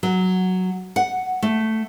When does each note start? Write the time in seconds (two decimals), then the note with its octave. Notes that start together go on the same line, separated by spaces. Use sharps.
0.03 F#3
0.96 F#5
1.42 A3